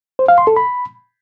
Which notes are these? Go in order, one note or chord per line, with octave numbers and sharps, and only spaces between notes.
C5
F5
C6
A4
B5